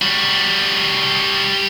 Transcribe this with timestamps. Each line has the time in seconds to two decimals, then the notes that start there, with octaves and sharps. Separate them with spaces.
0.02 G3 F#4